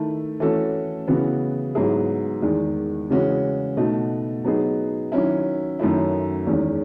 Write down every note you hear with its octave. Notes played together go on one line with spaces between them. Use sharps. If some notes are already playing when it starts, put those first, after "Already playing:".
Already playing: D#3 A3 E4
E3 A3 C#4 F#4 A4
C#3 E3 B3 F#4
G#2 F#3 B3 E4 G#4
E2 D#3 G#3
C#3 E3 G#3 C#4 F#4
B2 A3 D#4 F#4
F#3 B3 D#4 G#4
D#3 F#3 C#4 E4
F#2 D#3 F#3 A3 E4
E2 D#3 G#3 C#4